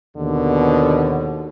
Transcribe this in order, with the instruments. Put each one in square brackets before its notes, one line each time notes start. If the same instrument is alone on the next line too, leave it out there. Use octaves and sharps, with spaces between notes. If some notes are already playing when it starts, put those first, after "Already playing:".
[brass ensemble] D#2 B2 [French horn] D3